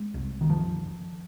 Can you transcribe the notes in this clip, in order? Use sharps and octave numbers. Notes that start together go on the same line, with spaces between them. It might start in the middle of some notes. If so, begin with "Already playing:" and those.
Already playing: G#3
C2
D#3
F#1 F3